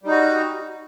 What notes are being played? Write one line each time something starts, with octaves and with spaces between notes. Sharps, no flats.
G3 D#4 F#4